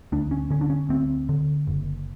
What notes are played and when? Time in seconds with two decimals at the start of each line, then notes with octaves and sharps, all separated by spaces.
0.12 D2 D4
0.31 C#4
0.50 D3 C#4
0.61 D4
0.70 C#4
0.89 D2 C4
1.29 D3
1.67 F#1